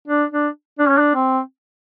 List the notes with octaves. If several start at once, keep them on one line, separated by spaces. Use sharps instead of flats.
D4
D4
D4
C#4
D4
C4